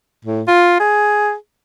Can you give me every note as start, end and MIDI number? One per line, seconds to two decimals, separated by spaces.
0.25 0.42 45
0.47 0.79 65
0.79 1.33 68